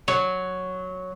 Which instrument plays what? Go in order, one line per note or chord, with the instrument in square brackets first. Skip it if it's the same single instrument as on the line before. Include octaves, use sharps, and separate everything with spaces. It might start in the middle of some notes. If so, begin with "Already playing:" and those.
[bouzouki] F#3 [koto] C#5